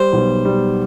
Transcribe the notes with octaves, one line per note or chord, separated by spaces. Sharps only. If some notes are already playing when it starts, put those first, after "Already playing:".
Already playing: G3 C5
B1
G3